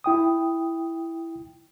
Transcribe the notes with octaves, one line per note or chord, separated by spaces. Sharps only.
E4 G5 D#6